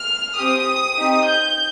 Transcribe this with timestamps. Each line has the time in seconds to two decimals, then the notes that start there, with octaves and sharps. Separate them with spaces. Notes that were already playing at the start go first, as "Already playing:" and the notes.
Already playing: F6
0.36 C4 G4 D#6
0.96 C4 D#4 G4
1.25 G6